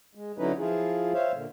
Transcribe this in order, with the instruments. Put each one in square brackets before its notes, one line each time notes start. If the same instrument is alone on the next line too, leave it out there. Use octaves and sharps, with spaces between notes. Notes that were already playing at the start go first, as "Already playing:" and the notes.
[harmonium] G#3
D3 F#3 C#4 D#4 E4 B4
F3 E4 F4 G#4
C5 C#5 E5 F5
A#2 D3